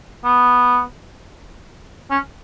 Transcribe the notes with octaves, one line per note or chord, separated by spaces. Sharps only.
B3
C#4